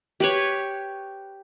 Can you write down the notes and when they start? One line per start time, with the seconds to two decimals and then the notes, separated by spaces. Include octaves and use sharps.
0.20 G4 B4 C#5